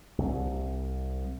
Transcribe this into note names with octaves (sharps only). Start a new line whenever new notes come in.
C2